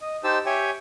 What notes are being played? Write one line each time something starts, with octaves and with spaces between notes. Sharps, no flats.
D#5
D#4 G4 C5 A5 E6
G4 C#5 E5 G5 G#5